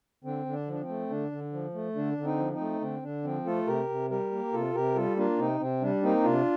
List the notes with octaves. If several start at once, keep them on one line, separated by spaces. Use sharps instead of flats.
D3 C4
D3
D4
F3
D4
C4
A3
D3 D4
D3
F3
A3
D3 D4
D3
C4 D#4
F3
C4 D#4
A3
D3 C4
D3 D4
F3 C4
A3 F4 A4
C3 G4 A#4
C3
G3 G4 A#4
A#3
C3 F4 A4
C3 G4 A#4
G3 F4 A4
A#3 D4 F4
C3 C4 D#4
C3 C4
G3 D4
A#3 C4 D#4
C3 D4 F4